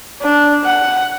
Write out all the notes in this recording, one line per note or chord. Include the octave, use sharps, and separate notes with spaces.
D4
F#5